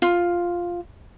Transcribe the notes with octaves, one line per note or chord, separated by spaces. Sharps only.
F4